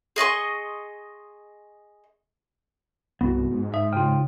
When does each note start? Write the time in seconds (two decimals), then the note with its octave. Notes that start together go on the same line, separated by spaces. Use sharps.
0.16 G#4 D#5 C6 C#6
3.21 C2 G2 B3 F#4
3.50 G#2
3.74 D#4 E5
3.93 C#3 F4 G5